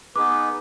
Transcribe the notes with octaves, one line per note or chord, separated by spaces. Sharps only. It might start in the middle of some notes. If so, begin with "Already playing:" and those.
B3 D#4 G#4 B4 D6